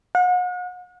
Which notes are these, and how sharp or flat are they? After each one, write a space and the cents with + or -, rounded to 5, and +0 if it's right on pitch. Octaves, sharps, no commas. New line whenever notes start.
F#5 -40